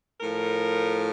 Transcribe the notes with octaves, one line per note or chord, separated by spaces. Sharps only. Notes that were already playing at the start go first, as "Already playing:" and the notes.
A2 F3 A#4